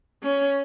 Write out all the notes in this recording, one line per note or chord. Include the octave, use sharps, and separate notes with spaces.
C#4